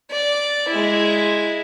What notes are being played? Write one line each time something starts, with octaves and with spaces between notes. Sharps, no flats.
D5
G#3 E4